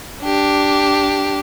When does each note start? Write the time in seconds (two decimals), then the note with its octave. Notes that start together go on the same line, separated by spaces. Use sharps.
0.23 D4 G4